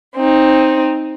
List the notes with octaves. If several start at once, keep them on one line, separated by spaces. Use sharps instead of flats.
C4 D#4